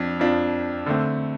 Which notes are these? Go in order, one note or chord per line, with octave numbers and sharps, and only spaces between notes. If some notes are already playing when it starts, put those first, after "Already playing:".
Already playing: F2 D4
F2 F3 D4
D3 A3 C4